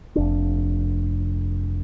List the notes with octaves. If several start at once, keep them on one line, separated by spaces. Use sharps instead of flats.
F1 D4